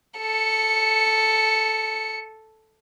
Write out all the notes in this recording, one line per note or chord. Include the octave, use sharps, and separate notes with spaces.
A4 C#7